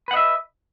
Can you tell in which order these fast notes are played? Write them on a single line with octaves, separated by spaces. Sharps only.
B4 F#5 D#5 E5